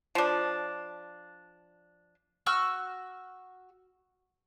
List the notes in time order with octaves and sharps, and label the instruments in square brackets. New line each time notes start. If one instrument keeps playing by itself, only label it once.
[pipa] F3 D4
[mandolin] F#4 C#6 E6 F6